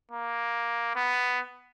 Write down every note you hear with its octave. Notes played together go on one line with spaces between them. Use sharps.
A#3
B3